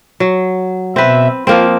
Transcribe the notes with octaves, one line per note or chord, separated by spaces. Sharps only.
F#3
B2 C4 B4 E5
F3 A#3 C4 F4